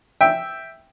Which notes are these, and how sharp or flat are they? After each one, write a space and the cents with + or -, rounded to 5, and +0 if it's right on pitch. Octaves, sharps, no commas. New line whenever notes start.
E5 +0 G5 +0